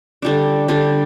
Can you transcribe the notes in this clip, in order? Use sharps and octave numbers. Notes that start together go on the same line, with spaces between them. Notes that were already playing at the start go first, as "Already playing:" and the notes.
D3 G3 D4
D3 G3 D4